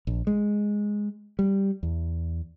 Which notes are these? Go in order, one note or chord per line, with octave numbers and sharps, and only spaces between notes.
A#1
G#3
G3
E2